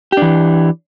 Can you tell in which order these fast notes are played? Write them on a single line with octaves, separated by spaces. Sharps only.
G4 D4 E3